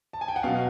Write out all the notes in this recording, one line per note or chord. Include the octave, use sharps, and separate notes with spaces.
A5
G#5
G5
F#5
B2 F#3 F5